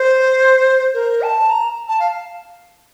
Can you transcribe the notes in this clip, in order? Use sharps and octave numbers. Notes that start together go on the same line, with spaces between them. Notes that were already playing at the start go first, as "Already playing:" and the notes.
Already playing: C5
A#4
A5
A#5
A5
F5